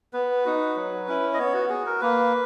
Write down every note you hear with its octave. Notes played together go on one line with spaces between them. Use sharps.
B3 B4
D#4 F#4
F#3
C#4 E4
D#5
B3 C#5
F#4
F#4 G#4
A#4
A#3 B4